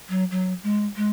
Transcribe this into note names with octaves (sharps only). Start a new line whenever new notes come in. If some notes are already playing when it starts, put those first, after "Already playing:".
F#3
F#3
G#3
G#3